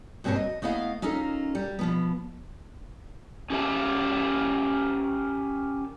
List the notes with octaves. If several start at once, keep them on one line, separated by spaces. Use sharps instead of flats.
G2 B2 C4 G4 A#4 C#5
D#5
A3 B3 E4 D#5 F5
C#4 D#4 F4 A4 A#4
G3
B2 F3 B3
C#4 G4 A#4 E5 A5